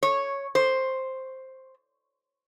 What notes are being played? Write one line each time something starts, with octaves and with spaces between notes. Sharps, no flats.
C#5
C5